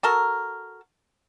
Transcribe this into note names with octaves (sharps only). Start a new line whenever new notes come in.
F#4 A4 A#4